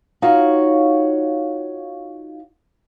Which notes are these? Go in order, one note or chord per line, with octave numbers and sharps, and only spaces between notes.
D#4 F4 F#4 C#5 F5